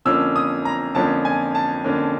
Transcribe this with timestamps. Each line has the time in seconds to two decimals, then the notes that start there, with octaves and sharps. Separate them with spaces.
0.05 F2 D3 F3 A#3 C#4 E6
0.36 D#6
0.65 A#5
0.95 F2 D3 F3 A#3 C#4 A5
1.25 G#5
1.55 A5
1.84 F2 D3 F3 A#3 C#4